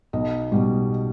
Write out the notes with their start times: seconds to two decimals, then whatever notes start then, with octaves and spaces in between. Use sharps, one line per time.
0.13 B1 D#5
0.52 B2 G3